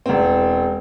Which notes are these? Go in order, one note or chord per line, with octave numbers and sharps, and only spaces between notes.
E1 C4